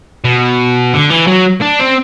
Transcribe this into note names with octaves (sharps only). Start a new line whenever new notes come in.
B2
D3
E3
F#3
D4
C4